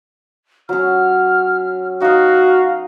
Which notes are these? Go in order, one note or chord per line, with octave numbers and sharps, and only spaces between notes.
F#3 C#4 F6
D#4 F#4 D#5 F5